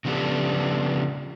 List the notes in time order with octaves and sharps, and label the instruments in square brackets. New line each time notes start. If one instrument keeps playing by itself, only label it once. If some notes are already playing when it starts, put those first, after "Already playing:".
[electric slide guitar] C#3 F3 B3 D4 G4 A4